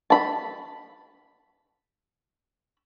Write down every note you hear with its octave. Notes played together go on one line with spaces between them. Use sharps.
A5 B5